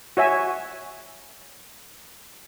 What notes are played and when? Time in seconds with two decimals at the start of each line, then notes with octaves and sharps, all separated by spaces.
0.17 F#4 C#5 E5 G#5